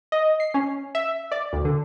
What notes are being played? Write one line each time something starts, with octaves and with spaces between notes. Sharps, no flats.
D#5
C7
C#4
E5
D5
D2
D3